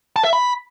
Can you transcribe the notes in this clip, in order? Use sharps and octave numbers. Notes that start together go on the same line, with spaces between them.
A5
E5
B5